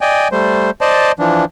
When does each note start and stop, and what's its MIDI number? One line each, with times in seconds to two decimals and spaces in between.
0.01 0.28 74
0.01 0.28 75
0.01 0.28 79
0.01 0.28 80
0.32 0.70 55
0.32 0.70 57
0.32 0.70 72
0.81 1.12 72
0.81 1.12 74
0.81 1.12 75
0.81 1.12 81
1.19 1.45 52
1.19 1.45 53
1.19 1.45 62